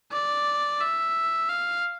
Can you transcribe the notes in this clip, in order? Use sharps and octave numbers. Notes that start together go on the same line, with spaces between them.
D5
E5
F5